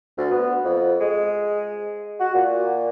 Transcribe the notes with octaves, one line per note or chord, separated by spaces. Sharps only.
D2
B3
F2
G#3
F#4
A#2